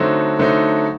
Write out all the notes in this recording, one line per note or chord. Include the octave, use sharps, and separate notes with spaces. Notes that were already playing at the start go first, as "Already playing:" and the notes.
Already playing: D3 F#3 A3 C4 D#4
D3 F#3 A3 C4 D#4